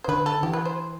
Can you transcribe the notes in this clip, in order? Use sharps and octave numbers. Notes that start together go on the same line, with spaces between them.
C5
D3 B4
A4
E3 G4
B4
C5